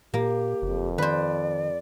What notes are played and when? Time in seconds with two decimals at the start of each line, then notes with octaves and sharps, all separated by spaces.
0.14 A#2 A#3 G4
0.62 F#1 F2
0.98 D#3 B4 C5 D5